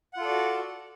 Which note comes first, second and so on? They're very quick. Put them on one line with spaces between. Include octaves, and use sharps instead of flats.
F#5 F4 A4 D5 F#4